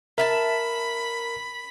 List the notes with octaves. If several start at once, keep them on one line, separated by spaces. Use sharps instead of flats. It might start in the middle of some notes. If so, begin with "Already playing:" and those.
A#4 E5 F5 A5 B5